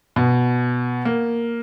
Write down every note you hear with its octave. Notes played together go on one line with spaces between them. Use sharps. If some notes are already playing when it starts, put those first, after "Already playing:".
B2
A#3